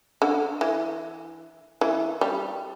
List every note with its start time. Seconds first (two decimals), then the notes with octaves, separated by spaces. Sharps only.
0.22 D3
0.61 E3
1.81 E3
2.21 G3